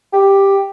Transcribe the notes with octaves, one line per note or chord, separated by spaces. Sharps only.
G4